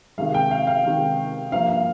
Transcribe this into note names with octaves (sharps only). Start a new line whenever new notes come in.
C3 D#3 G#3 F5
G5
F5
F5
C3 D#3 G#3
G2 F3 A#3 F5
F5